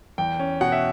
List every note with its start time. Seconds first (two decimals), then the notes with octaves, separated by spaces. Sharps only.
0.18 E2 G5
0.40 C#4
0.61 B2 F#5
0.72 E5